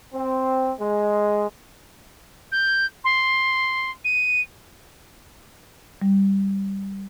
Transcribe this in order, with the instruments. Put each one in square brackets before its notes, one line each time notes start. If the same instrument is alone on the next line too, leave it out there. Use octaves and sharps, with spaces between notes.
[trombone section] C4
G#3
[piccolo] G6
C6
D#7
[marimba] G3